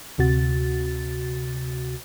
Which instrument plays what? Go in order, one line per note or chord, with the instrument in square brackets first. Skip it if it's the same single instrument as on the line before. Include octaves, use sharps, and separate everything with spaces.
[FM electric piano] D2 C3 F#4 A6